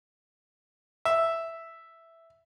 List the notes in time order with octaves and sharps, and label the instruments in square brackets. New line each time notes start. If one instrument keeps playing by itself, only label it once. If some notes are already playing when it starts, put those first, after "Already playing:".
[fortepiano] E5